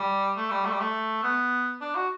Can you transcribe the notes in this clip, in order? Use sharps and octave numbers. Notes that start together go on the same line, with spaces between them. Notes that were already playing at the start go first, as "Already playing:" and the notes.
Already playing: G3
A3
G3
A3
G3
A3
B3
D4
F#4